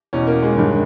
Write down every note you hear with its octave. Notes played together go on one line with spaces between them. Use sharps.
E2 B2 C#4
A#3
G#3
G2 D#3